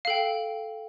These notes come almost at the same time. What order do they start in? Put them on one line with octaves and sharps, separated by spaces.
F5 A4 G5